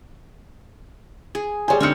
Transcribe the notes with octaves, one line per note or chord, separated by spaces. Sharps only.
G#4
G3 G#4 C5 C#5 G#5
D3 C4 D#4 C#5 F6 C#7